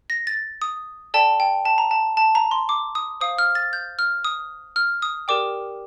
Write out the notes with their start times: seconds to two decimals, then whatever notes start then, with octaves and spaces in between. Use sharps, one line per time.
0.10 A#6
0.27 A6
0.62 D#6
1.14 A4 D5 G5 A5
1.40 G5
1.65 A5
1.78 A#5
1.91 A5
2.17 A5
2.35 A#5
2.51 C6
2.69 D6
2.95 D#6
3.21 C5 F5 D#6
3.38 F6
3.55 A6
3.73 G6
3.99 F6
4.25 D#6
4.76 F6
5.02 D#6
5.28 G4 A#4 D5 G5 D6